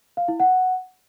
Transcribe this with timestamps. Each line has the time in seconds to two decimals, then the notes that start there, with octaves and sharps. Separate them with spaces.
0.17 F5
0.28 E4
0.40 F#5